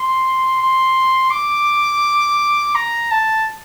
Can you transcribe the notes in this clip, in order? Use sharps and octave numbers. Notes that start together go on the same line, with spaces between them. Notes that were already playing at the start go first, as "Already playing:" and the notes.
Already playing: C6
C6
D6
A#5
A5